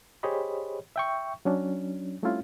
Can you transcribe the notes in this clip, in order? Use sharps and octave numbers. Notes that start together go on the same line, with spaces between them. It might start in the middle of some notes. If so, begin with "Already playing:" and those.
G4 G#4 C5 C#5 D#5 B5
E5 G5 C#6
F#3 C#4 D4
G3 A3 C4 C#4 E4 F4